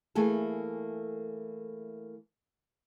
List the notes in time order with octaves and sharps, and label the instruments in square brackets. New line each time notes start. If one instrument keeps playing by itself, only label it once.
[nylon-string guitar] E3 A3 A#3 G#4 A4